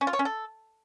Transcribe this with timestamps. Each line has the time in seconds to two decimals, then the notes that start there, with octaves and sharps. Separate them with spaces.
0.01 C#4
0.07 F4
0.13 C#5
0.19 C#4
0.25 A4